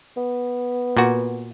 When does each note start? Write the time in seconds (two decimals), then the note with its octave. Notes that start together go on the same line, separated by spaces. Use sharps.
0.17 B3
0.97 A#2 F#4